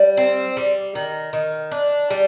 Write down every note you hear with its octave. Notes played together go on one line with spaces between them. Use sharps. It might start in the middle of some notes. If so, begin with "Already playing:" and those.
Already playing: G3
C4
G3
D#3
D#3
D4
G3